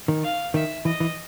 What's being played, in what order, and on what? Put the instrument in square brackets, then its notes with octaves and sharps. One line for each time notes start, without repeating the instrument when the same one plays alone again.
[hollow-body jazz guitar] D#3
[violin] F5
[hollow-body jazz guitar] D#3 [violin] E5
[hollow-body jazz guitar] E3 [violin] D#5
[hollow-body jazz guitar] E3